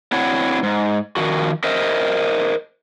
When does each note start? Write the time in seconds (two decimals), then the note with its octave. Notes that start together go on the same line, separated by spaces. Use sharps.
0.12 C4 D4 E4 F#4 C#5 F#5
0.63 G#2
1.17 D#3 F3 F#4
1.64 A#4 C5 D#5 E5